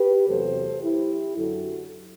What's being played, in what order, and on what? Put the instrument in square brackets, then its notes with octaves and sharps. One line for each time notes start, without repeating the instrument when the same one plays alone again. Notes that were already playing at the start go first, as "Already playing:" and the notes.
Already playing: [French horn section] G4 B4
E2 C3 F#3 A3 A4 C5
E4 G4
F#2 D3 F#3 F#4 A4